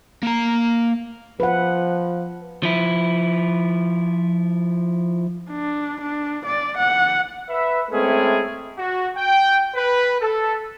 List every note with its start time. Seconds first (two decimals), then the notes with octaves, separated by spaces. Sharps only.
0.23 A#3 A#5
1.40 F3 B4 F#5
2.63 F3 E4
5.50 D4
6.01 D4
6.46 D5
6.78 F#5
7.50 B4 E5
7.91 G#3 A3 C4 C#4 E4 G#4
8.78 F#4
9.17 G5
9.75 B4
10.20 A4